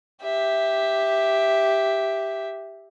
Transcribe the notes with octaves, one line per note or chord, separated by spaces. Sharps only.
G4 E5